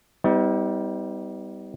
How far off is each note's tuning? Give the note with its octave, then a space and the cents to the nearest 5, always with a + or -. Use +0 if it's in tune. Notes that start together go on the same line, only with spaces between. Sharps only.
G3 +0 B3 +40 D#4 +45